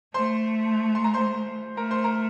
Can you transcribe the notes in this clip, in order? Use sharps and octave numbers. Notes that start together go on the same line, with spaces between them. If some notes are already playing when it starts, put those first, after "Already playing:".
A3 C5 C6
C6
A#5
C5 C6
A3 A#4 A#5
C5 C6
A#4 A#5